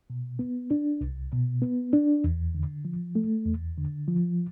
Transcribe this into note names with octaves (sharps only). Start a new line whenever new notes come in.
B2
B3
D4
C2
B2
B3
D4
E2
D3
F3
A3
E2
D3
F3